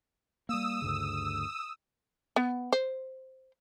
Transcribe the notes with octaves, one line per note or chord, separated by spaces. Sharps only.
G3 A#3 D#6 E6
D2 G2 C#3
B3
C5